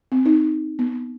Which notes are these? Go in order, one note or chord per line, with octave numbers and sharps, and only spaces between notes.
C4
D#4
B3